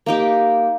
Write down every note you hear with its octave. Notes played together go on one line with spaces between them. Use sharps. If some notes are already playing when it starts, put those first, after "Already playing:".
A#3 D#4 G4